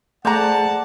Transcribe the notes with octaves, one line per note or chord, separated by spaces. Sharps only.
A3 G#4 C5 D5 F#5 A5 A#5